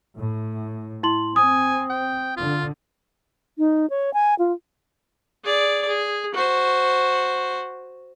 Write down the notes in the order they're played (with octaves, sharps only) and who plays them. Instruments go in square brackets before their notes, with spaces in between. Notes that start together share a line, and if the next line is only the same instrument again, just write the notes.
[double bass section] A2
[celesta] E4 C6 F#7
[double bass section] C4 [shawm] G#5 [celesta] D#6
[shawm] G5
[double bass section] D3 [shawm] F4
[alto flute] D#4
C#5
G#5
F4
[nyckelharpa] G#4 D5
G#4
F#4 C5